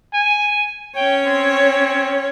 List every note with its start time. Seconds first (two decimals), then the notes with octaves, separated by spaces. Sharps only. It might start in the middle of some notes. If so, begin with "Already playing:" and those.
0.14 G#5
0.96 C#4 C#5 G5
1.27 C4